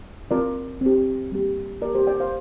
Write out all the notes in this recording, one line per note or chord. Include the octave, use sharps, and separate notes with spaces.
C4 F4 A#4 D5
C4 G4
G3 A#3 G4
A#3 G4 A#4 D5
G4 C5
D5 G5
C5 F5